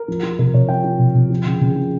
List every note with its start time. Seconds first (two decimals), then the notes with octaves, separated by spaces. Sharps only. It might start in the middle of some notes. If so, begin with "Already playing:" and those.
Already playing: A#4
0.08 F3
0.23 F3
0.39 C3 A#4
0.54 C3 C#5
0.69 F3 G5
0.84 F3
0.99 C3
1.15 C3
1.30 F3
1.46 C#3
1.61 C#3
1.76 F3